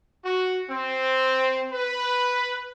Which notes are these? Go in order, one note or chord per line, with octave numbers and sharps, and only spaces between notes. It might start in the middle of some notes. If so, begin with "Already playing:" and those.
F#4
C4
B4